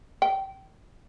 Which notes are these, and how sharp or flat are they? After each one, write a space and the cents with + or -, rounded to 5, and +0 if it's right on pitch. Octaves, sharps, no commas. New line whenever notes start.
G5 -25